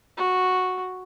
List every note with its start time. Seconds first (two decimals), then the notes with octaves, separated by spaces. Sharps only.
0.17 F#4